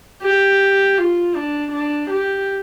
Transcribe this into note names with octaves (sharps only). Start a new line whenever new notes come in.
G4
F4
D4
D4
G4